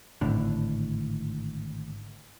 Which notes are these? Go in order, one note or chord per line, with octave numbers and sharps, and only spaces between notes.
G#1 A2 D3